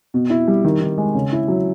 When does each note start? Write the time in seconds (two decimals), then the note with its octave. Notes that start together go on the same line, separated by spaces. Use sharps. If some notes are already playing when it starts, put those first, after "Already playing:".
0.14 B2
0.30 E4
0.48 G3
0.65 D#3
0.81 D#3
0.98 G#3
1.15 C#3
1.32 E4
1.48 F#3